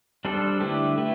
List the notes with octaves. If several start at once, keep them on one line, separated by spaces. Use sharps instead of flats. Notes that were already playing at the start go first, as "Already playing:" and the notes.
G3 D4 A4 C5
D3 A3 E4 G4 B4
A3 E4 B4